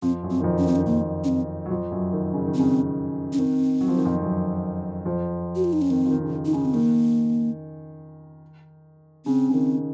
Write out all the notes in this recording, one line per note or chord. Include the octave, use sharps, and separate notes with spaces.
F2 F3 C4
F#2 F#3
C4
D#3
F2 F3
C#4
D#3 C4
D#3 C#4
F2 F3 A#3
C#4
C4
F#3
F2 F3
F#2 F#3
D#3
C#3
D#3
C#3 C4
C#4
D#3 C4
F#3
F3
D#3
F2 F3
F#2 F#3
F2 F3
F#4
F4
D#4
C#4
D#3 C4
F3
D#3
C#3
D#3
D#4
C#3 C#4
C4
D#3 A#3
C#3 C4
C#3
D#3